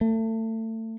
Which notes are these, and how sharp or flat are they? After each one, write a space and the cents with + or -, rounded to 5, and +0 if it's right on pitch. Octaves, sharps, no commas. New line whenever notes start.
A3 +25